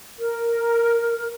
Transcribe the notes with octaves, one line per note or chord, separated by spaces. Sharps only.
A#4